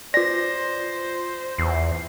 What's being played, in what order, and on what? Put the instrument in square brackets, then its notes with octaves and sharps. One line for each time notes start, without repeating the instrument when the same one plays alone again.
[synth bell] F4 D5 [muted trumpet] C5 [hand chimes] A#6
[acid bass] E2 [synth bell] C7